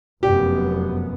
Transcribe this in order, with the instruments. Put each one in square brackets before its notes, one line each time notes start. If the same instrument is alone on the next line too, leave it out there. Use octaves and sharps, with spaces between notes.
[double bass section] F1 F#2 B3 [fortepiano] G4